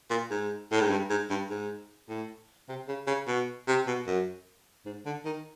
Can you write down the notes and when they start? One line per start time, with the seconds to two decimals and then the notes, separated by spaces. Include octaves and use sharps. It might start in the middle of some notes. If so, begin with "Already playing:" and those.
0.10 A#2
0.31 G#2
0.72 A2
0.81 G#2
0.90 G2
1.10 G#2
1.30 G2
1.50 G#2
2.09 A2
2.69 C3
2.88 C#3
3.07 C#3
3.27 B2
3.68 C3
3.87 B2
4.07 F#2
4.86 G#2
5.06 D3
5.25 D#3